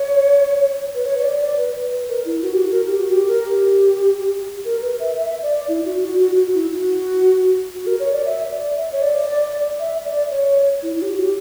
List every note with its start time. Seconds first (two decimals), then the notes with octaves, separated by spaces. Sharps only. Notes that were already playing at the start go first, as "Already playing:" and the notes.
Already playing: C#5
0.95 B4
1.06 C#5
1.18 C#5
1.22 D5
1.40 D5
1.57 B4
1.91 B4
2.08 A#4
2.25 E4
2.42 F#4
2.53 G4
2.60 F#4
2.72 A#4
2.86 G4
2.99 F#4
3.11 G4
3.28 A#4
3.45 G4
4.65 A#4
4.82 B4
4.99 E5
5.16 E5
5.42 D5
5.68 E4
5.85 F#4
6.03 F#4
6.20 F#4
6.36 F#4
6.55 E4
6.72 F#4
7.74 F#4
7.87 A#4
8.00 C#5
8.12 D5
8.25 E5
8.51 D5
8.77 E5
8.92 C#5
9.02 D5
9.80 E5
10.05 D5
10.31 C#5
10.83 E4
10.96 E4
11.02 G4
11.08 F#4
11.21 G4